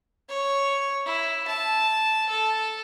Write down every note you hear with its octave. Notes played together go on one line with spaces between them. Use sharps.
C#5
E4
A5
A4